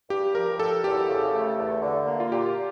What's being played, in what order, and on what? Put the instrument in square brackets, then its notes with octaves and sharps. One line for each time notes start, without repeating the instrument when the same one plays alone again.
[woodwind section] G2 [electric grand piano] G4
[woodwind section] F3 [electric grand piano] A#4
[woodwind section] G2 [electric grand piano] A4
[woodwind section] E2 [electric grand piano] G4
[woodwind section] C#3
A3
E2
D3
A#3
[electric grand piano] F4
[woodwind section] A#2 [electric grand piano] G4